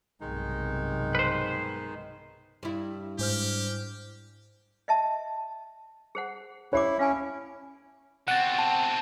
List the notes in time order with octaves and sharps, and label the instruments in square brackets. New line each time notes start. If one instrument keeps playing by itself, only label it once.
[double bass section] B1 G2 C3 [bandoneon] D#3 G#3 D#4
[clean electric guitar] B4 C5
[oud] G2 E4
[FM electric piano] G#2 C5 F6 [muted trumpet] G4
[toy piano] D#5 E5 A5
G#4 C5 F#5
[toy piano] C#4 G4 D6 [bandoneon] E4 [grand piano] C#5
[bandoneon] C#4 [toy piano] F5 G#5
[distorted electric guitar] B2 C4 [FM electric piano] F#5 A6
[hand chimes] A5